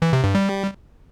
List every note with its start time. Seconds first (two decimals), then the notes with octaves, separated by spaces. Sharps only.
0.02 E3
0.13 C3
0.24 G2
0.35 G3